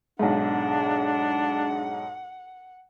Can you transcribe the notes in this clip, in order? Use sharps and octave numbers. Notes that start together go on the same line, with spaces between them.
B1 G#2 D4 F#5